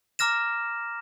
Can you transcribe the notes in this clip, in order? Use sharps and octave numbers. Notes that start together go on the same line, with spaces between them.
A#5 D6 F6 A#6 E7